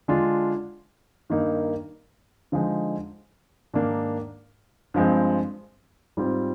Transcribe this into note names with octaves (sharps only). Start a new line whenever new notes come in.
D3 G#3 D4 F4
G2 D#3 A#3 D#4
D3 F3 G#3 D#4
G#2 D#3 A#3 D4
G2 F3 G#3 C4
G#2 G3 C4 F4